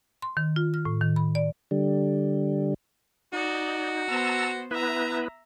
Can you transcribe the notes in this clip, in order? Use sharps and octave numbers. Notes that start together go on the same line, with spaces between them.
C6
D#3
F4
F6
A2
D#3
B5
D5
D3 G3
D#4 F#4 D5 D#5
B3 C5 A5 A#5 E6
B3 E4 B4 E5 A#5